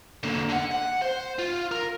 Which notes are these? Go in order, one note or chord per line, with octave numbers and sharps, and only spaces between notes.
D3 A#3
D3 F#5
F#5
C5
F4
A#4